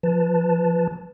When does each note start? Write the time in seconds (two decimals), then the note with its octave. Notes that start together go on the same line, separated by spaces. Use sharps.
0.03 F3 B4 A5